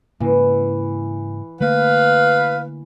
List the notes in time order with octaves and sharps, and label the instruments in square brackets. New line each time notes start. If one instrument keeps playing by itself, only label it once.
[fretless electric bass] G#2 C#3 A#3 [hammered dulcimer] E3
[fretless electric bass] D3 A3 A#3 [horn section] B4 F5